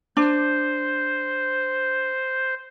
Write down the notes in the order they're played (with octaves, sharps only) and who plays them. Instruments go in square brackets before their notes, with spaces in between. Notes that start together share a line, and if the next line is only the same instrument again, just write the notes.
[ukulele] D4 [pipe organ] C5